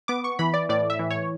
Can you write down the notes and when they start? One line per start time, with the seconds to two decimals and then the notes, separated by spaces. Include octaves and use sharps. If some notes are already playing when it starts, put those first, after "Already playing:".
0.08 B3 D6
0.24 C#6
0.39 E3 B5
0.54 D5
0.69 A2 D5
0.90 E5
0.99 E3
1.11 C#5